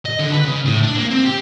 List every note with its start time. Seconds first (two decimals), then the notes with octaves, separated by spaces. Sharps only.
0.05 D#5
0.19 D3
0.32 B4
0.45 C#3
0.65 A2
0.83 D4
0.96 A#3
1.10 C4
1.25 G4